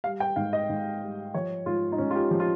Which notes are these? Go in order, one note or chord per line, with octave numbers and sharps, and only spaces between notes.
G3 F5
G5
G#2 F5
D#5
G#2
G3
F3 C#5
G#2 F4
D#4
G#2 C#4
F4
G4
F3 G4
F4